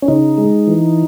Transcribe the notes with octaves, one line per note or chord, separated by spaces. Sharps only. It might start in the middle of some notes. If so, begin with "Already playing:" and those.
C#4
C#3 D#4
G#3
E3